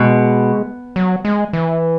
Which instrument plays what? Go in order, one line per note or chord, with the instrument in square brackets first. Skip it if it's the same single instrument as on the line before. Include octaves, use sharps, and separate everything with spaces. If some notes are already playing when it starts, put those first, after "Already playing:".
Already playing: [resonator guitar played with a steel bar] B2 [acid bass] G#3
[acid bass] F#3
G#3
E3